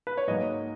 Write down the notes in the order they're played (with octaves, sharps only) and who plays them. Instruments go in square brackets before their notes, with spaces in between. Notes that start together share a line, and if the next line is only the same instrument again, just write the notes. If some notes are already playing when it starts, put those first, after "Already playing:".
[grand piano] B4
C#5
G#2 F#3 A#3 D#5